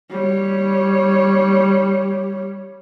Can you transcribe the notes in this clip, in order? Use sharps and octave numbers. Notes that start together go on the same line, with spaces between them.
G3 C#5